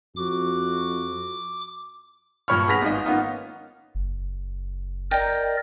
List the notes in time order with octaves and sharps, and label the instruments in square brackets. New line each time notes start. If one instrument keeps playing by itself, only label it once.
[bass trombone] F2 [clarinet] F#4 [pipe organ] D6
[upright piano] G2 A#2 C#5 B5 C#6 F6
B3 G#4 B4 A#6 B6 F7
G#1 G#2 D#5
A#3 B3 C#4 D#4 F4
[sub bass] F#1
[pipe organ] A#4 D5 D#5 [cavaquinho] G5 A#5